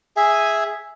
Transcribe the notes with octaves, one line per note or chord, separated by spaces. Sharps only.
G#4 E5 G#5